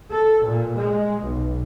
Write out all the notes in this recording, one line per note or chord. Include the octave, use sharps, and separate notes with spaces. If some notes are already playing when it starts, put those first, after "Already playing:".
A4
A#2
G#3
B1